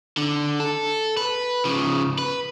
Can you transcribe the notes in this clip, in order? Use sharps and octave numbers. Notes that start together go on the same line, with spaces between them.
D3
A4
B4
C#3 F3
B4